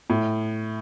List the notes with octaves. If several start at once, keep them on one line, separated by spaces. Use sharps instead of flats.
A2